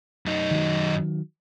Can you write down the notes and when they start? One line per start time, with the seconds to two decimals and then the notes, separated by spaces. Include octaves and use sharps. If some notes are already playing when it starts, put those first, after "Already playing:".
0.26 F#2 D#4
0.51 D#3 F#3